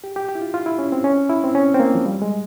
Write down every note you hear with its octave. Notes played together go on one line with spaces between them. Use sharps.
G4
G4
G4
E4
F4
F4
E4
C#4
C4
C#4
E4
C4
C#4
C4
A#3
F3
G3
G#3